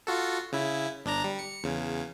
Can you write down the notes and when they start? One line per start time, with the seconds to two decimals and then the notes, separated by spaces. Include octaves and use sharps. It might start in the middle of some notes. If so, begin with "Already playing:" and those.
0.07 F4 F#4 A4
0.53 C#3 E4
1.05 G1 D4 A#5
1.24 G3
1.39 C#7
1.64 E2 C#3